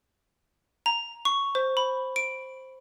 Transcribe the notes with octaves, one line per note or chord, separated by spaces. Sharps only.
A#5
C#6
C5
B5
D7